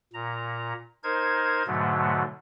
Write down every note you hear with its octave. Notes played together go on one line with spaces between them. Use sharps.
A#2 A#5
D#4 A#4 C5 G#6
G#2 B2 D3 F#3 A3